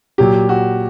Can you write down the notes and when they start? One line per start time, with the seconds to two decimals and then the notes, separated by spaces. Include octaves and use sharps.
0.18 A#2 F#3 G4
0.49 F#4